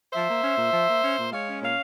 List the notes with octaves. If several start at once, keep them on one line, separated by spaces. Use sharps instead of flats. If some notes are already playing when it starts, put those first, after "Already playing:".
F3 C5 E5
A#3
C#4
A#2
F3
A#3
C#4
A#2
G#3 C#5 F5
C#4
A#2 C#5 F5